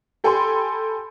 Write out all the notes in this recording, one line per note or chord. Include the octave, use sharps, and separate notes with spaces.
G4 A4 G5 G#5 B5 C6